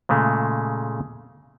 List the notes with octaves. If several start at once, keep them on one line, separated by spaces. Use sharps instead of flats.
A#2 C#3 G#3 A3